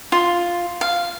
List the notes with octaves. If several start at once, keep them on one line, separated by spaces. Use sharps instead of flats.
F4
F5